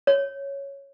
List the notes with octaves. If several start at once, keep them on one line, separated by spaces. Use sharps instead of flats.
C#5